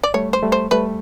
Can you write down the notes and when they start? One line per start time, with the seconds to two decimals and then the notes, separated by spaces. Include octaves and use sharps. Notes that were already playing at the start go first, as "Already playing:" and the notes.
0.03 D5
0.14 G3 A3 C#5
0.33 C5
0.43 G3 A3
0.52 C5
0.71 G3 A3 B4